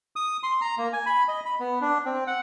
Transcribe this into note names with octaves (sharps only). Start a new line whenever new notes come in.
D#6
C6
A#5
A#3
G#5
B5
D#5
B5
B3
D4
C4
F#5